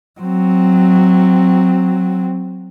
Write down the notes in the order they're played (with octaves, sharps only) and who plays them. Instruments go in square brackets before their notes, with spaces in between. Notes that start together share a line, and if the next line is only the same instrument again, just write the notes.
[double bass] F#3 C4